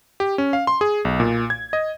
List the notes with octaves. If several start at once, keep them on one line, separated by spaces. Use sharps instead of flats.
G4
C#4
F5
C6
G#4
B1
A#2
G#6
D#5